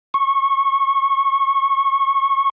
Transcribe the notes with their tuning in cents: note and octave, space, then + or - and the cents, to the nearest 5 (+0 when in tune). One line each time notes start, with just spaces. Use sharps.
C#6 -20